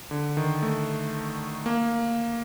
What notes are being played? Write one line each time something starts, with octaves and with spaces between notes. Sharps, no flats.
D3
D#3
A3
A#3